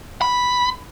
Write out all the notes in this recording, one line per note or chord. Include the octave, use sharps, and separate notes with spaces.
B5